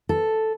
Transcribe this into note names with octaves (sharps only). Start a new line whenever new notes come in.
A4